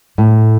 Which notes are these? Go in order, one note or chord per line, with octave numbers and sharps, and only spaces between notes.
A2